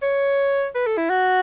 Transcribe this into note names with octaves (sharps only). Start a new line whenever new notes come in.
C#5
B4
A4
E4
F#4